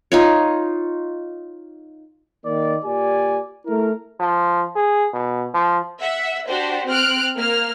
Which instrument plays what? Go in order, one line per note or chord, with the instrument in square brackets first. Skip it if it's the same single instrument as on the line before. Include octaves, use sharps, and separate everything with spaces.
[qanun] D#4 F4 C#5
[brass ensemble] D#3 A#3 D5
A#2 G4 D5 G#5
A3 E4 A#4
[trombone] F3
G#4
B2
F3
[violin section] E5 F#5
D4 F#4 G4 C5
C4 F6 F#6 D7
A#3 F6